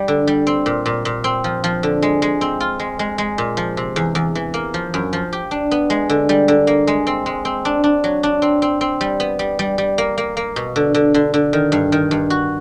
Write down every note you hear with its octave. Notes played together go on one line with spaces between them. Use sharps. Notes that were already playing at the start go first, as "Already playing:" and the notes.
Already playing: G3
D3
G3
C4
A#2
A#2
A#2
C4
F3
F3
D3
G#3
G#3
C4
F4
G#3
G#3
G#3
A#2
F3
C3
E2
E2
E3
A#3
F3
F#2
F3
G4
D4
B3
G#3
D3
G3
D3
A#3
G#3
C4
G#3
C4
D4
D4
F#3
D4
C4
C4
C4
G3
B3
G3
G3
G3
A#3
A#3
A#3
B2
D3
D3
D3
D3
D#3
G2
D#3
G2
F#4